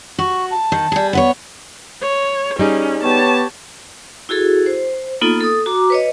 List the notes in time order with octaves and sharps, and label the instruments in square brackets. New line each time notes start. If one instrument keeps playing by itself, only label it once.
[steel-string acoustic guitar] F#4 [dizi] C#6
[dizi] A5
[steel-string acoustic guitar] D#3
G3 G#4
[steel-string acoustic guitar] B3 B4 C#5 [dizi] F#5
[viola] C#5
[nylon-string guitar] G3 D#4 G#4 [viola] C#4
[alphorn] B3 [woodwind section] G4 C#5 [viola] A5
[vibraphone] E4 F#4 G#4 A4
C5
A#3 B3 D#4 F4 A4
A4 D#6
F#4 A#5 D6
B4 C#5 D#5